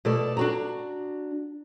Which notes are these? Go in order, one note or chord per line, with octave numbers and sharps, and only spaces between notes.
B2 A3 A4 D5
D4 F#4 A#5